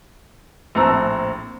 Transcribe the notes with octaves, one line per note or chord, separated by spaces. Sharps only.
A#1 A2 C4 A5 A#5 E6